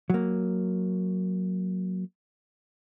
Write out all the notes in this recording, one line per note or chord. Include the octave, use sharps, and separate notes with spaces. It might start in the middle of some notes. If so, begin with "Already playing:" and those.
F#3 A#3